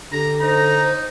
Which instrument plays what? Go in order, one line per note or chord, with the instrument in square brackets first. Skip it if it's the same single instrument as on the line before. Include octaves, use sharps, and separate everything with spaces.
[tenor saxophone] D3 [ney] G4 [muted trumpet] A#5
[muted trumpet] D#4 [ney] C5 [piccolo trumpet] A#5